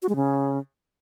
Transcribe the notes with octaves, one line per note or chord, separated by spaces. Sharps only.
F#4
G#3
C#3